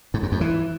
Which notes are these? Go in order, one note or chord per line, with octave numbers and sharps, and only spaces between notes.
G#2
F#2
F2
E3